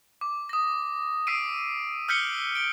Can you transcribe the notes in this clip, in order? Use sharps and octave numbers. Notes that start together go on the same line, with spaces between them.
D6
D#6 A#6
D#6 E6 B6 C7 D7 D#7
E6 F6 G6 B6 C#7 G7
D7 G7